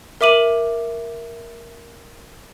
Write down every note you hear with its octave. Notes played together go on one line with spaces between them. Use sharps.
A#4 E5 D6 D#7 F#7